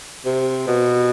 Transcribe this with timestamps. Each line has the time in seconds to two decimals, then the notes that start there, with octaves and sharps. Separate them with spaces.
0.26 C3
0.67 B2